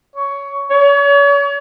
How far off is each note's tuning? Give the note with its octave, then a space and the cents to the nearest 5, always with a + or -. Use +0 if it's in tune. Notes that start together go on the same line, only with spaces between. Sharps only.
C#5 +15
C#5 +40